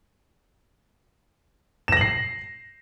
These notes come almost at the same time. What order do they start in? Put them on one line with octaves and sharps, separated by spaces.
E7 A#6 F#7 C7